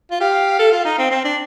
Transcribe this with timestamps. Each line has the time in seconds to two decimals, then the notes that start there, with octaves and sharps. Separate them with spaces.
0.11 F4
0.20 G4 F5
0.59 A4
0.72 F4
0.85 D#4
0.98 C4
1.11 C4
1.25 D4